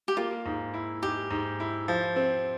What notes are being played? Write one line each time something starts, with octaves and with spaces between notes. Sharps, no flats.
G4
A#3 F4
G#2
E4
G#2 G4
G#2
E4
F3
C4